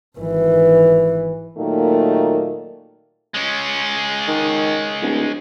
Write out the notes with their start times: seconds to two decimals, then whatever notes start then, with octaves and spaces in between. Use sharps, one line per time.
0.19 G#1 E3
1.57 A#2 D#3 F#3 A3 A#3
3.34 G#3 C#4
4.28 D#3
5.02 D1